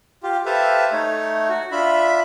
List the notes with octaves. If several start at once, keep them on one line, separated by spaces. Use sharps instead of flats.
F4 G4
G4 A4 B4 C5 E5 F5
A3 D#4 C#5
F#4
D4 F4 E5 B5